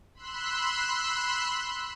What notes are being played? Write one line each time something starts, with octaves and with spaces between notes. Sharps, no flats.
B5 C6 E6 F#6